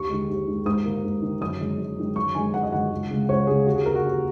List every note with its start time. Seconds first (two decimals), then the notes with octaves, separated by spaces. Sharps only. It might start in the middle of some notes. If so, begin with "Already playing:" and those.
Already playing: D#2 C#6
0.10 D#3 G#3
0.29 D#2
0.48 D#3 G#3
0.66 G#2 D#6
0.85 D#3 A#3
1.04 G#2
1.22 D#3 A#3
1.41 F#2 D#6
1.60 D#3 G#3
1.79 F#2
1.98 D#3 G#3
2.16 F#2 C#6
2.35 D#3 G#3 G#5
2.54 F#2 F#5
2.63 D#5
2.72 D#3 G#3 F#5
2.91 C#2
3.11 C#3 G#3
3.29 C#2 C#5
3.47 C#3 G#3 G#4
3.67 D#2 F#4
3.76 G#4
3.86 C#3 A#3 A#4
3.95 F#4
4.05 D#2